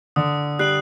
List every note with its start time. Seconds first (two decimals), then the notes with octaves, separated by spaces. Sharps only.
0.16 D3 D#6
0.59 G3 F#6 C7 F#7